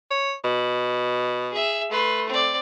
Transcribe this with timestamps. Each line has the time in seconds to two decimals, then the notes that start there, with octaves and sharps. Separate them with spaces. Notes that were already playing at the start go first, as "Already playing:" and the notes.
0.11 C#5
0.45 B2
1.52 G#4 E5
1.91 A3 B4 C6
2.29 C4 D5